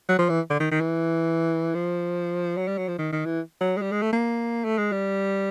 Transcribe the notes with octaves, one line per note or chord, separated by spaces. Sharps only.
F#3
F3
E3
D3
D#3
D#3
E3
F3
F#3
G3
F#3
F3
D#3
D#3
E3
F#3
G#3
G3
G#3
A3
A#3
A3
G#3
G3